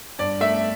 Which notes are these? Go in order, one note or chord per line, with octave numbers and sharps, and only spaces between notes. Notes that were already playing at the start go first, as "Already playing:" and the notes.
G2 D5
A3 E5